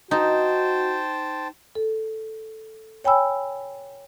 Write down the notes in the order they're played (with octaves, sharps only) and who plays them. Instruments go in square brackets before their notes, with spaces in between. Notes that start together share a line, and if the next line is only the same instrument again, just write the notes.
[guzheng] D#4 [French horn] F#4 [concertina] C5 G5 A5
[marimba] A4
C#5 G5 G#5 B5 E6